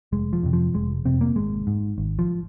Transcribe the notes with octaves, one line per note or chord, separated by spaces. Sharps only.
F1 G#3
F3
F2 C3
F3
F1 G#3
F2 C3 C4
A#3
G#1 G#3
G#2
G#1
F3